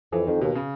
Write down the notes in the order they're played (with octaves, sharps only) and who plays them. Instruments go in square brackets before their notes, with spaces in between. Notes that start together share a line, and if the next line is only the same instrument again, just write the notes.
[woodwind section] F2 [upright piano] E3
[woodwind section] F2 [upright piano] D#3
[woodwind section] D#2 [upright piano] B2
[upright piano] C#3